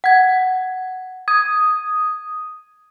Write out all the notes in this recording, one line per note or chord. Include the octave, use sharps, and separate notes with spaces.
F#5 G#6
D#6 G#6